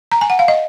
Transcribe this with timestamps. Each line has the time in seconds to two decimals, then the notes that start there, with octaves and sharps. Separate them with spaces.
0.12 A#5
0.21 G#5
0.30 F#5
0.39 F5
0.48 D#5